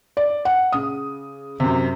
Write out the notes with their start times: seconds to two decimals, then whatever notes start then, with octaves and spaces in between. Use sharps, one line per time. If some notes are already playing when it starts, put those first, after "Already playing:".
0.17 D5
0.45 F#5
0.72 C#3 D#6
1.60 F#2 C3